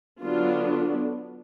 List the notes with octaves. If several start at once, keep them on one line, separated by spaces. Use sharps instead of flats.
D3 F#3 B3 D4 F4